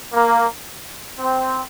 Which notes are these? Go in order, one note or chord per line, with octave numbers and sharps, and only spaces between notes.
A#3
C4